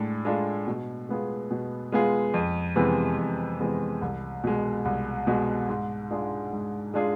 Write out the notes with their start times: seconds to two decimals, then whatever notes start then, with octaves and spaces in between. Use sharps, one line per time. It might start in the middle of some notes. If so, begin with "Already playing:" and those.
Already playing: A2 G#3 D4 A4
0.25 G#3 D4 F4 A4
0.67 B2
1.09 G#3 B3 F4 G#4
1.51 B2
1.92 G#3 B3 F4 G#4
2.34 F2
2.76 C3 E3 G#3 B3
3.18 F2
3.60 C3 E3 G#3 B3
4.01 C2
4.44 B2 G#3
4.85 C2
5.27 B2 G#3
5.69 G#2
6.11 G#3 D4 F4 G#4
6.52 G#2
6.94 G#3 D4 F4 G#4